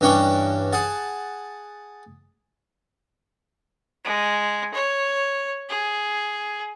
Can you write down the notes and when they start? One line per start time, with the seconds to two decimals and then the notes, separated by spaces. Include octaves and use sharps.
0.01 G2 E3 C#4 G5 C#6 D6
0.73 G#4 F#5 A5
4.04 G#3
4.74 C#5
5.69 G#4